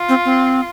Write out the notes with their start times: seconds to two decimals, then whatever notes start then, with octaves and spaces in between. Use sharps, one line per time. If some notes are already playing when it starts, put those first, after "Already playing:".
Already playing: F4
0.09 C4
0.25 C4